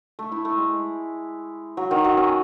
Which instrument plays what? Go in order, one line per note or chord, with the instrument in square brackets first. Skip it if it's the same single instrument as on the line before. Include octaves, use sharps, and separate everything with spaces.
[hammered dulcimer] A3
E4
A3
G#3
F#3
D#3
F#3
C#4